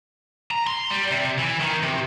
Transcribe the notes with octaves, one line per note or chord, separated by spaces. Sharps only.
A#5
C6
G3
C3
E3
D#3
C3